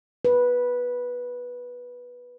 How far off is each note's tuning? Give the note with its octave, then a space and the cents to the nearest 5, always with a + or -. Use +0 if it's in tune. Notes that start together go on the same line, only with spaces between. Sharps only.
B4 -10